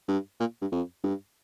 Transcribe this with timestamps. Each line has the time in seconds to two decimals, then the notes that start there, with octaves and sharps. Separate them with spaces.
0.08 G2
0.40 A#2
0.61 G2
0.72 F2
1.04 G2